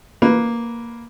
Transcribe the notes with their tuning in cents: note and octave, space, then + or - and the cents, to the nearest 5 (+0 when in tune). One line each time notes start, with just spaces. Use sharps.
A#3 +0 B4 +0